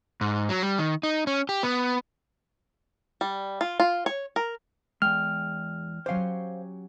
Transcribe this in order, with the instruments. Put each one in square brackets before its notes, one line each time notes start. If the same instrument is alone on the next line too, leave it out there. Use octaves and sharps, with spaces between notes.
[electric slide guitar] G#2
F#3
G3
D#3
D#4
C#4
G4
B3
[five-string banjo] G3
F4
F4
C#5
A#4
[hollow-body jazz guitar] E2 G#3 [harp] G5 [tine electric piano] F6
[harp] F#3 C#4 G4 [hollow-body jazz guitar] C5 F5